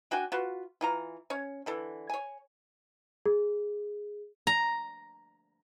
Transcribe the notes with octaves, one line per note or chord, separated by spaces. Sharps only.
D4 F#4 G5 G#5
F4 F#4 B4
E3 F4 A#5
C#4 C#5
D3 E3 A4
C#5 G#5
G#4
A#5